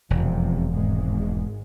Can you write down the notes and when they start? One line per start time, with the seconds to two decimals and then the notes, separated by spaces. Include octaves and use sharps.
0.10 E1 F2 C3
0.73 G#1 G#2 G#3